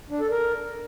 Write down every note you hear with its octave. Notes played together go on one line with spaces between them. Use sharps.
D4
A4
A#4